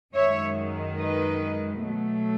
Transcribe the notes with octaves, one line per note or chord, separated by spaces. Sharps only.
F#2 D#3 G#3 C#5 E5
B4 D#5
B2 F#3 A3